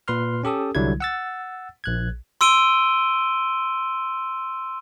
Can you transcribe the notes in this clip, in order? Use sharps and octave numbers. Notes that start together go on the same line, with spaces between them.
A#2 B4 C6 F6
C#4 G4 A4 D#6
C2 D3 F#3 G3 E4 G#6
F#5 E6 A6
A#1 F#6 G#6
C6 E6 D7 D#7 G7